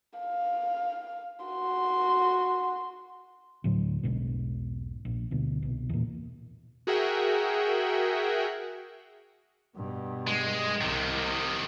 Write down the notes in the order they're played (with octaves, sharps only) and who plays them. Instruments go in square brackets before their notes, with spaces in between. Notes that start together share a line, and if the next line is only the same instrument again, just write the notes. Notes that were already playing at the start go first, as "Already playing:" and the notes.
[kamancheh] F5
F#4 C6
[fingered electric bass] D2 A2 F#3
E1 B1 G#2 B2
A#1
D2 B2
C2 B2
E2 A#2
[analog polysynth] F#4 G#4 A#4 E5 F#5 G5
[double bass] G2 B2
[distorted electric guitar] G#3
[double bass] C2 [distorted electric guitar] C3 D#3